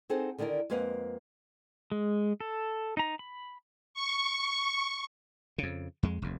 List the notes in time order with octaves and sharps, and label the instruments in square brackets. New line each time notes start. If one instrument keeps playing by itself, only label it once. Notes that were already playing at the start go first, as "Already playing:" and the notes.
[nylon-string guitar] C4 D#4 G#4 A4 C5 F#5
D3 D#3 D4 E4 A#4
F2 G#3 A#3 B4 F5 F#5
[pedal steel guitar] G#3
A4
D#4 A#5
B5
[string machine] C#6
[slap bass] F2 C#3
F2 G#3
F1 D#2